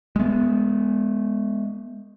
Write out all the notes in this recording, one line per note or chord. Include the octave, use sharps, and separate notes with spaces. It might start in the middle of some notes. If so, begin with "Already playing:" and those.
G#3 B3